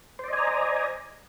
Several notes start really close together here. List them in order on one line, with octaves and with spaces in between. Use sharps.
C5 D5 D#5 G#5 A#5